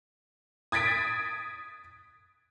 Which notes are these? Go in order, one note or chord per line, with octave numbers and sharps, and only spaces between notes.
D#6 G#6 A6 B6 D7